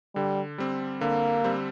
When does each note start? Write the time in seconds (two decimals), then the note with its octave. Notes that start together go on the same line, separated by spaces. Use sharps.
0.15 D3 G3
0.58 G3 C4
1.01 D3 A#3
1.44 G3 C4